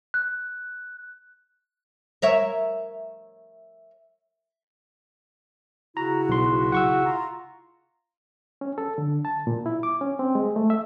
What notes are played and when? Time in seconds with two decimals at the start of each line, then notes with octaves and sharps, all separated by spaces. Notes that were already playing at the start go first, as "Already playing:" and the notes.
0.14 F#6
2.22 A#4 C#5 E5
5.97 C#3 E4 F#4 A#5
6.29 B1 C6
6.72 F#5 C#6 E6
7.06 F4 A#5
8.61 C#4
8.78 A4
8.98 D3
9.25 A5
9.47 A#2
9.66 E4
9.83 D6
10.01 C#4
10.19 C4
10.35 G#3
10.56 A3
10.70 E5